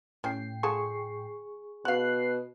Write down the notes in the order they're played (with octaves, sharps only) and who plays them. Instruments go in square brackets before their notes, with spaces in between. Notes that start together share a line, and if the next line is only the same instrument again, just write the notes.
[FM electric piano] A2 G5 C7 [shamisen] C#4 G4
[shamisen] D3 F4 A5 [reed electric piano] G#4 C#6
[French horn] B2 [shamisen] F#4 F5 [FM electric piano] F#6 C7